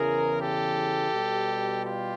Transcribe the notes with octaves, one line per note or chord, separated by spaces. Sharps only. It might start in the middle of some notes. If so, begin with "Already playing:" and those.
Already playing: E2 C#3 E3 G#4 A#4
G4 A4
B2 G3
F4 G4